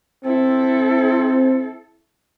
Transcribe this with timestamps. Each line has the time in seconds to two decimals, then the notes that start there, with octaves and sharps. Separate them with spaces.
0.25 C4 E4 A4